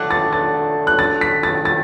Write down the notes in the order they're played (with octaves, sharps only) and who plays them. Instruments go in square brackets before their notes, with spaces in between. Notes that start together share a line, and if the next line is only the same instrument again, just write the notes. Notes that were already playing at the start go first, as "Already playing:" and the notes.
Already playing: [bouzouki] D3 A3 D4 [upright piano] F#6
[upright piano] A6
A6
F#6
A6
B6
A6
A6